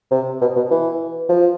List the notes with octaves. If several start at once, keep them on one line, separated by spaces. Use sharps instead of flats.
C3
B2
B2
E3
F3